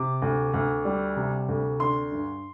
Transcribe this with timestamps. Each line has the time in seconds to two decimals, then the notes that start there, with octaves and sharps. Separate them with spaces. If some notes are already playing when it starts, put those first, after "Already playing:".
Already playing: C3 D6
0.22 D2
0.54 D2
0.85 G3
1.17 C3
1.48 D2
1.80 D3 C6
2.12 G2